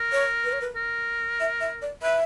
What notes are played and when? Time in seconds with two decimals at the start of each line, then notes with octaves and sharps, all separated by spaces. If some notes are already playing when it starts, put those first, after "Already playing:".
Already playing: A#4
0.12 C#5
0.44 B4
0.53 C#5
0.61 B4
0.76 A#4
1.40 E5
1.60 E5
1.82 D5
2.03 B4 E5